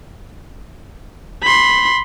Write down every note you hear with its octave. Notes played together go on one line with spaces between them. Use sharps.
B5 C6